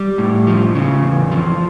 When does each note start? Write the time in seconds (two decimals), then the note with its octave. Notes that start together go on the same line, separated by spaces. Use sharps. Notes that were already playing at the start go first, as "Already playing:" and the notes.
Already playing: G3
0.18 A2
0.47 F3
0.75 C#3
1.03 E2
1.32 F3